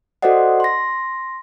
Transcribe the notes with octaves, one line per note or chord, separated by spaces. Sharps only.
F#4 A4 C5 D5 D#5 F#5
C6 A#6